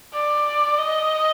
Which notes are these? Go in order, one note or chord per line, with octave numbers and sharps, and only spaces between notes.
D5
D#5